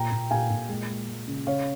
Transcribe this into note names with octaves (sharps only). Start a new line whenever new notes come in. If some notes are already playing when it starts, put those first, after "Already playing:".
Already playing: A#2 G5 A#5
A#2
A#2 F5 G#5
A#2
G#3
G#3
G#3
C#3
C#3 C#5 F5